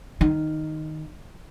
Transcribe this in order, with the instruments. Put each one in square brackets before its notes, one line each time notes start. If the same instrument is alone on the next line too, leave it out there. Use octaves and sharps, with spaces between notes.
[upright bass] D#3